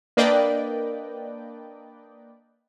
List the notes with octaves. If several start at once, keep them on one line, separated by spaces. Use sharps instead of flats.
A#3 D4 B4 D5 D#5 G5